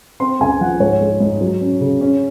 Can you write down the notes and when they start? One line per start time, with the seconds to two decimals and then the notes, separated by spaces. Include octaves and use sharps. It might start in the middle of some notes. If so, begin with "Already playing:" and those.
0.20 C4 C6
0.40 C#2 G#5
0.61 F3 F#5
0.80 G#2 C#5
1.01 G#3
1.20 G#2
1.41 F#3
1.61 C#4
1.80 C#3
2.01 C#4